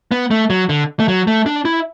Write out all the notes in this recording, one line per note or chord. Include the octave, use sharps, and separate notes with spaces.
B3
A3
F#3
D3
A3
F#3
A3
D4
E4